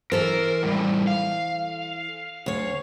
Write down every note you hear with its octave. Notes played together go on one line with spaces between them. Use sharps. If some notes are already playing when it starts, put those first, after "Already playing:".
E3 A4 A#4 C5
A2 G3
F5
D2 C#5